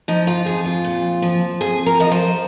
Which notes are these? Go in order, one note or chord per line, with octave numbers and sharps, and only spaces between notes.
F3 D#4
F4
F2 G#4
F4
A#2
F3
F2 G#4
A#4
F3 D#5
C5